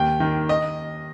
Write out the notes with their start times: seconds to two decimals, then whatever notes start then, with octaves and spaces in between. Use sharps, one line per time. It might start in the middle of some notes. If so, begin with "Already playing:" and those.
Already playing: D#2 G5
0.20 D#3
0.49 D#5